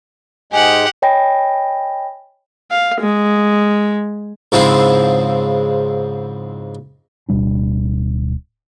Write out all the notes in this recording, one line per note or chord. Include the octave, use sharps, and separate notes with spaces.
G#2 G#3 G4 G#4 F#5
C#5 D#5 G5 G#5 B5 A#6
F5
G#3
G#2 C#3 F3 G#3 C4 E4
D1 B2 G3 D4